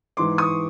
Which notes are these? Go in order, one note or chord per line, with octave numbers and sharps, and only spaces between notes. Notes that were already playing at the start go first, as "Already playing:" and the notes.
G#2 E3 C6 D6
C#6 D#6